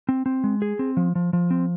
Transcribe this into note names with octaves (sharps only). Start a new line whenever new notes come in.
C4
C4
G#3
G#4
C4
F3
F3
F3
C4